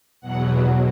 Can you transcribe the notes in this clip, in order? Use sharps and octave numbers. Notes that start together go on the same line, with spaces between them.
E2 B2 F#3 F#5